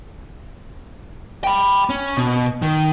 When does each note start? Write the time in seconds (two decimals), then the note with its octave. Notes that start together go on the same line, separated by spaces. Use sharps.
1.44 G5 B5
1.89 C#4
2.17 B2
2.62 D#3